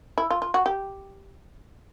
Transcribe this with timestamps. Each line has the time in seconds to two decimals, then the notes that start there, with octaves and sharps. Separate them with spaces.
0.18 E4
0.30 F4
0.42 F4
0.54 F#4
0.66 G4